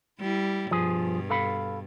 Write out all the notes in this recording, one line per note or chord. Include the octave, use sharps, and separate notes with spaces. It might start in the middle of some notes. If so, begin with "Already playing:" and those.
G3 E4
G2 B2 F3 G#4
A4 F5 B5